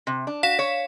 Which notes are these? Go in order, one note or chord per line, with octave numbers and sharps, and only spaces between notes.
C3
D4
F#4 F5 B6 E7
C#5